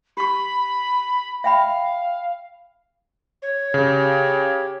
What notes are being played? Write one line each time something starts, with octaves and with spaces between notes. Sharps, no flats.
G4 B5 C#6
E5 F5 G5 B5
C#5
C#3 G4